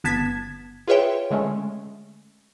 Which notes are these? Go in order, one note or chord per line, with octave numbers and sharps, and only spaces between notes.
G1 B3 A5 G#6 B6
F4 G#4 B4 C#5 E5 G5
D3 G#3 A3 C#4